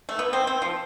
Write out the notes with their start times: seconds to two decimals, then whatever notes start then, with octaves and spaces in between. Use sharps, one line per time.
0.09 A3
0.19 B3
0.33 C4
0.47 C4
0.62 F3